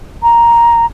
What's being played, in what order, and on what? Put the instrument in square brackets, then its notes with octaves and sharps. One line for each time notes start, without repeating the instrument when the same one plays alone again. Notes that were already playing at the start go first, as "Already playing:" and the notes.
[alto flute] A#5